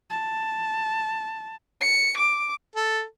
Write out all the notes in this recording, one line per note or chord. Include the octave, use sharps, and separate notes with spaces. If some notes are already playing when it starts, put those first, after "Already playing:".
A5
C#7
D6
A4